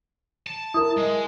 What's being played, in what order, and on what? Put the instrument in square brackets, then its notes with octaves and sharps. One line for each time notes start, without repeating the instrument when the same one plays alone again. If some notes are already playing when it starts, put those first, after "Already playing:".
[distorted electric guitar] A5
[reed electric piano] E4 A#4 [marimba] D#6
[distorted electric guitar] G#3